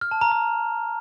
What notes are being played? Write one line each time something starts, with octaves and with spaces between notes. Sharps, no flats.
F6
A5
A#5
A#5